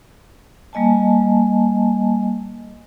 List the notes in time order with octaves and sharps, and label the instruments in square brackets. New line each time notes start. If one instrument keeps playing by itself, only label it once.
[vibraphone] G3 A#3 D#5 G#5 A5